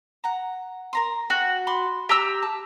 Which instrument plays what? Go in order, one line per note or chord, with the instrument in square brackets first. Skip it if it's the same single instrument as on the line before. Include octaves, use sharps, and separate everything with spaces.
[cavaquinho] F#5 A#5
A#4 A#5 C6
[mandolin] F#4 [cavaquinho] G5
[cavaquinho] B5 C6 D6
[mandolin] G4 A#5 E6
[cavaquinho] A5